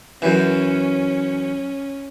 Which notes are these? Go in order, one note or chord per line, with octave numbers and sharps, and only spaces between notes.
F#2 E3 C#4